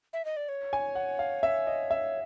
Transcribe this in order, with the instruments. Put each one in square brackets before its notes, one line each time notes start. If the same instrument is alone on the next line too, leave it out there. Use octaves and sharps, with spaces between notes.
[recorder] E5
D#5
D5
C#5
[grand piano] G#5
F#5
F5
E5
D#5
E5